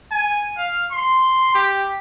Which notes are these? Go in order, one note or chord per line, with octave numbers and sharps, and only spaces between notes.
G#5
F5
C6
G4